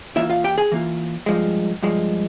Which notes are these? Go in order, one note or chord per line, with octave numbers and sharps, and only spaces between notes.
E3 A#3 E4 F4 E5
F4 F5
G4 G5
G#4 G#5
E3 A#3 F4
G2 F3 G#3
G2 F3 G#3